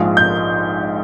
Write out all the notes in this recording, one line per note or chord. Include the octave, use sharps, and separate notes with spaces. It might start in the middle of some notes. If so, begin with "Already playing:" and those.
Already playing: A#1 G#2 F3 G#3
G6